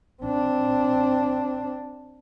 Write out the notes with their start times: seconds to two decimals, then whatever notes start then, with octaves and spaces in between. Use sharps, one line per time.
0.22 C4 D4